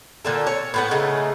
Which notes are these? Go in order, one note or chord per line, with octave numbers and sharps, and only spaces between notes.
A#2 D3 A4
C#5
A2 B3 F#5
C#3 A3 D#4